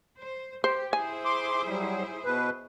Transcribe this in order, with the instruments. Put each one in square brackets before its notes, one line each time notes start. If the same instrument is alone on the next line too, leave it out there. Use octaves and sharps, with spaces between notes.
[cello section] C5
[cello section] G4 [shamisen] C5
[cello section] E4 G#4 C5 [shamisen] G#5
[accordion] C6 D6
F#3 G3
B2 B4